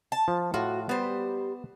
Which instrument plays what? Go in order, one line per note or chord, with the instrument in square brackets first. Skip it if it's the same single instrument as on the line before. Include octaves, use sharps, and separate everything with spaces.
[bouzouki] A5
[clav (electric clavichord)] F3
[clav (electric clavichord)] A2 F4 [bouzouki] F#4
[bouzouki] G3 C5 [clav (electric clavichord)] B3